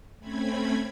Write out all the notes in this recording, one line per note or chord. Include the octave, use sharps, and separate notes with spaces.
A3 C4 C#4 B5 G#6